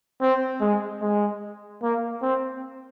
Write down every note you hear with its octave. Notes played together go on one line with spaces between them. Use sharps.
C4
G#3
G#3
A#3
C4